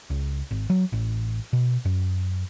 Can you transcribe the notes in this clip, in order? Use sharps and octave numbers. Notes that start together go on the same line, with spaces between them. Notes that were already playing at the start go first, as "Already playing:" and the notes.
C#2
G#1
F#3
A1
B2
F#2